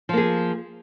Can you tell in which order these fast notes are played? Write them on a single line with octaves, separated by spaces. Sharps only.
F3 A#3 G#4